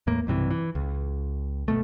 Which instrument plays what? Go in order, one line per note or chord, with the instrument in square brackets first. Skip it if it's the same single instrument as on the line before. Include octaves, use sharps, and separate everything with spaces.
[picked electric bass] E2 A2 A#3
B1 G2 C3 E3
E3
C#2
F#1 B2 A3